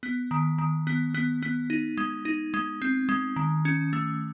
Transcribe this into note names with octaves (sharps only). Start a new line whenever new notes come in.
B3
D#3
D#3
B3
B3
B3
D#4
G#3
D#4
G#3
C4
G#3
D#3
C#4
A3